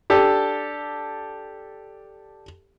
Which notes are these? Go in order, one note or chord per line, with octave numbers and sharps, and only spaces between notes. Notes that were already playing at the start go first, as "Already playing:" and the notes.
D4 G4 A4